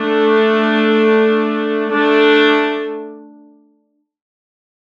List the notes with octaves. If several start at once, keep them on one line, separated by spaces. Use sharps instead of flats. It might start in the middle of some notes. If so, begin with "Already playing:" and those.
Already playing: A3 D4
A3 D4